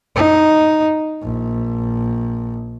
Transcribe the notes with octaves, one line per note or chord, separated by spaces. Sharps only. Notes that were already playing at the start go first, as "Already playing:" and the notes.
D#4
A#1